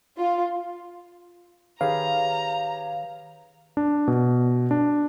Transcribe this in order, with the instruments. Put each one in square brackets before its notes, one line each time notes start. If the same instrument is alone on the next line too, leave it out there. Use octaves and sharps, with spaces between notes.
[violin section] F4
[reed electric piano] D#3 B4 C#5 [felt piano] G4 G#4 [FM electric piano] F5 [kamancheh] A#5
[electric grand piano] D4
B2
D4